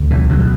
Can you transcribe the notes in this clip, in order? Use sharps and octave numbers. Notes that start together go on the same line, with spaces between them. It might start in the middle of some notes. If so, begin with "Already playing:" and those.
Already playing: D2
B1 E3
D3 F#3
B2